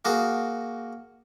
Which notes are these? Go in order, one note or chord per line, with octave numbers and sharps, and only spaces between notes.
A#3 F#4 G#4